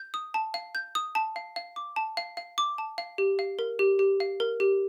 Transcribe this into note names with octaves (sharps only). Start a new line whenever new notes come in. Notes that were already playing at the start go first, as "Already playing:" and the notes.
Already playing: G6
D#6
A5
F5
G6
D#6
A5
F5
F5
D6
A5
F5
F5
D6
A5
F5
G4
F5
A#4
G4
G4
F5
A#4
G4